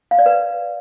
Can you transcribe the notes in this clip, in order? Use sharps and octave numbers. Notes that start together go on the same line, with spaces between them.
F5
D5
B4